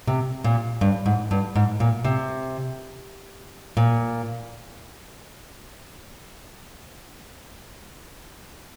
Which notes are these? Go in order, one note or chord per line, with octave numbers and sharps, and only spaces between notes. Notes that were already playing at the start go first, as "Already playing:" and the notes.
C3
A#2
G2
G#2
G2
G#2
A#2
C3
A#2